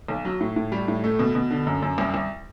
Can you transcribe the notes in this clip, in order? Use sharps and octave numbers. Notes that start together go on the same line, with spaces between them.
B1
F#3
A2
A2
G3
A2
A3
B2
B2
D3
F#2
F#2
C2
C2